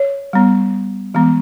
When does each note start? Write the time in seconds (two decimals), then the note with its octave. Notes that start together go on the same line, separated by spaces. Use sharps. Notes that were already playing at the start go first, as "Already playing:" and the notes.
Already playing: C#5
0.33 G3 B3
1.14 E3 G#3 B3